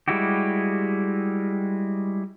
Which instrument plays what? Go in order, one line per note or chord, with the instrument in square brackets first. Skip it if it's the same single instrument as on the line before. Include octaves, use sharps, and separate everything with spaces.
[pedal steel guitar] G3 G#3 E4 F#4 G4